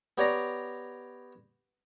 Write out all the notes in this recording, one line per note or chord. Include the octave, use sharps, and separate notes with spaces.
B3 G4 C#5 D5 A#5